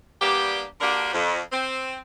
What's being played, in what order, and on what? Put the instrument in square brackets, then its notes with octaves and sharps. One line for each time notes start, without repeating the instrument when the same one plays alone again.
[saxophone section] G3 A#3 B3 D4 G4
D3 A#3 D4 F#4 G4 A#4
F2
C4